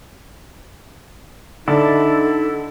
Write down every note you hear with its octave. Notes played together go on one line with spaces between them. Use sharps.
D3 D#4 E4 A4 D5 A5